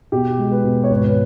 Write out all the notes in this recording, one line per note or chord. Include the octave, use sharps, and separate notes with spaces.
B2 G4
G#3
B4
B2
C#5
G#1 B4
B4